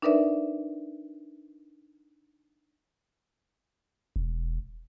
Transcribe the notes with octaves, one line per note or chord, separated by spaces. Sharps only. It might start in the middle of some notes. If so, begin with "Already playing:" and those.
D4 D#4 A#4 B4 D5 E5
E1